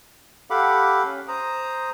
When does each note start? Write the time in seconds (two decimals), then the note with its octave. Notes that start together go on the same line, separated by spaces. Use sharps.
0.50 G4 A4 F5 F#5 B5 D6
1.04 C#4
1.28 C5 A#5 D#6